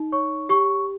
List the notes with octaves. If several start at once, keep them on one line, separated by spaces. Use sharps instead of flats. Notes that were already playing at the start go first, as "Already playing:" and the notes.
Already playing: D#4
C#5 C#6
G4 C#6